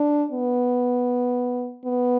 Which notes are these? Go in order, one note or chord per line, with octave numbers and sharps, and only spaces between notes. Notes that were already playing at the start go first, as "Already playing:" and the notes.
Already playing: D4
B3
B3